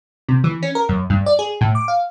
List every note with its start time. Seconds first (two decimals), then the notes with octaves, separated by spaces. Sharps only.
0.29 C3
0.44 E3
0.63 C#4
0.75 A#4
0.89 F#2
1.10 G2
1.26 D5
1.39 G#4
1.61 A2
1.75 D6
1.88 F5